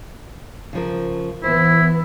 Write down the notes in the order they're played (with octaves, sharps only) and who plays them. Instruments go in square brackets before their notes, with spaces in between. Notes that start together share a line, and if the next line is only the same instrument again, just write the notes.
[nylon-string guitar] C#3 F3 A#4
[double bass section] E3 B3 [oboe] E4 [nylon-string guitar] C5